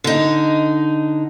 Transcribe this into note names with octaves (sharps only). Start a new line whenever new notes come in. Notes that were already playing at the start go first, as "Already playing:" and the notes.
D3 D#4